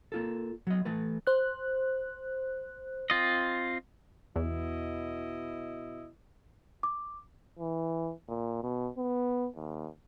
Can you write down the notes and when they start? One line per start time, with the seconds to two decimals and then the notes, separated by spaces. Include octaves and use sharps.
0.12 A#3 F4 A4
0.67 F#3 D#5
0.85 E3 A3 B4
1.27 C5 F#6
3.10 C4 F4 D#5
4.36 E2 B2 E4 D#5
6.83 D6
7.59 E3
8.28 A#2
8.63 B2
8.98 B3
9.56 D#2